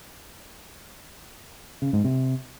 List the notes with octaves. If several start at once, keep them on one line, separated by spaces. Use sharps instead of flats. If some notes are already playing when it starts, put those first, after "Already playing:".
C#3
G#2
C3